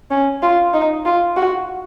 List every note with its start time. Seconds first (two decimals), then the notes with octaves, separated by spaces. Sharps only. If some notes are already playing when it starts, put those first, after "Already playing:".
0.11 C#4
0.42 F4
0.74 D#4
1.05 F4
1.36 F#4